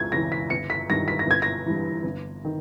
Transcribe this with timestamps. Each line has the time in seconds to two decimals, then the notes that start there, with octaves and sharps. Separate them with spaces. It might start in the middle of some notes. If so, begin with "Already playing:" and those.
Already playing: C#2 G#6
0.12 C#3 E3 A#6
0.32 B6
0.50 G1 C#7
0.70 B6
0.90 G2 D#3 A#6
1.08 B6
1.19 A#6
1.27 G1 G#6
1.42 A#6
1.66 G2 E3
2.04 G1
2.45 D#3